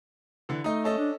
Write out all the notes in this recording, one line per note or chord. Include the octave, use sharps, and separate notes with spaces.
D3 E3
A3 D#4 D#5
C#4 A4 D#5
D4